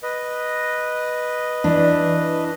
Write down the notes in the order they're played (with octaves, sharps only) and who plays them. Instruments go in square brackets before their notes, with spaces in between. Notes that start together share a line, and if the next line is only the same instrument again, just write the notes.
[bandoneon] B4 D#5
[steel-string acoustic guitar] E3 D4